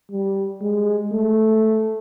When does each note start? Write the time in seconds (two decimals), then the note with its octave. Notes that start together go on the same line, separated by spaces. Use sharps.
0.11 G3
0.62 G#3
1.11 A3